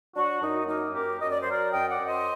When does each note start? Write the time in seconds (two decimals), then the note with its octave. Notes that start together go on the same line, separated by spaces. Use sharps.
0.16 F#3 D4 F#4
0.42 F#2 D#4
0.67 A#3 D#4
0.93 F#2 G4 A#4
1.20 F#2 D#5
1.30 D5
1.41 F#3 C5
1.51 A#4 D5
1.71 F#2 D#5 G5
1.89 D5 F#5
1.98 F#2
2.06 C5 D#5